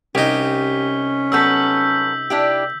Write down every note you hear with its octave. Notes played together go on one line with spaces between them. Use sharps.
C2 C#4 D#4 G4 B6 G7
F#3 B3 A4 E6 G6 B6
D4 E4 G4